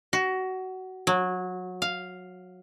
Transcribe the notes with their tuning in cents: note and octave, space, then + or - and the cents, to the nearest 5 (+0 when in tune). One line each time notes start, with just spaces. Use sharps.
F#4 +20
F#3 -20
F5 +0